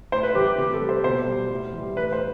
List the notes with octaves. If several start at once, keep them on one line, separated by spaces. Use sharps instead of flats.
A2 C5
B4
E3 G3 G4
G4
C3 G4
A4
G3
C5
B2 C5
G3
A2
E3 G3
A2 B4
C5